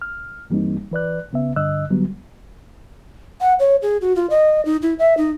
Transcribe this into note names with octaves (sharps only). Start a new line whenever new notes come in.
F6
G2 E3 G3 A#3 C4 D#4
E3 B4 D5 F#6
C2 C#3 B3 E5
G2 D3 D#5 E6 F#6
D3 F#3 G3 B3
F#5
C#5
G#4
F#4
F4
D#5
D#4
E4
E5
D#4